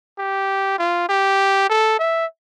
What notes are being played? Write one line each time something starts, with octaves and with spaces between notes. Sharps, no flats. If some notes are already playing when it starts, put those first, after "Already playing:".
G4
F4
G4
A4
E5